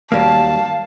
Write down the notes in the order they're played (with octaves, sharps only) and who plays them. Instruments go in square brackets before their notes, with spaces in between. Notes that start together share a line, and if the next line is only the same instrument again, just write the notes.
[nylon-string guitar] D#2 [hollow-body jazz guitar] F#3 G3 A#3 [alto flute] F5 [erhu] A5